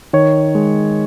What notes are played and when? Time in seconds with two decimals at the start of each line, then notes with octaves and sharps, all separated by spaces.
0.13 D#3 C#5
0.55 G#3